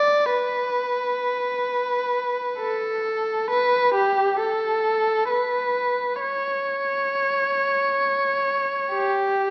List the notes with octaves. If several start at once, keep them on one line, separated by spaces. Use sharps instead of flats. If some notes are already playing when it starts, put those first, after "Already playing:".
Already playing: D5
B4
A4
B4
G4
A4
B4
C#5
G4